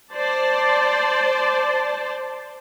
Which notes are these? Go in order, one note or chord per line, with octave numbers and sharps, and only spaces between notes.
C5 D5 A5